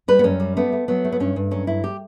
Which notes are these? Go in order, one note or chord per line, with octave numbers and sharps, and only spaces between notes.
G3 B4
B3
F#2 C#4
G3
A3 B3
A3
F#3 B3
A3
B3
G2 C#4
G2
F#3 C#4
G2 E4
G4